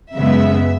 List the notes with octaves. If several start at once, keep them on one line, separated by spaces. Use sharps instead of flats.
F#2 C#3 G#3 B3 E5